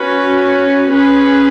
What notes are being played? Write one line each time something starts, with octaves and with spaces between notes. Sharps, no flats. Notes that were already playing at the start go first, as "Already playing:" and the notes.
Already playing: C#4 F#4 B4
C#4 G#4 B4